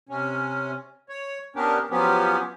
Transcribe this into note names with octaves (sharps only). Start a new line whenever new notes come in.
C3 C#4
C#5
B3 C#4 D4 G4 A#4
F3 F#3 B3 C#4 G4